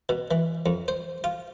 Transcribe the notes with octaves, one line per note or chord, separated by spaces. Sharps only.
B2
E3
F2
C5
F4